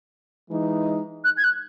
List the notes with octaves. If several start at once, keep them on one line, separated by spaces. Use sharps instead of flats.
E3 G#3 D#4
F#6
G#6
F#6